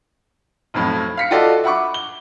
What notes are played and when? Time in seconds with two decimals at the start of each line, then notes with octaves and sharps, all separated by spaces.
0.74 B1 F2 A2
1.17 F5 B6 C#7
1.31 F4 F#4 A4 D5 D#5
1.64 E5 F#5 B5 C#6 D6
1.94 G7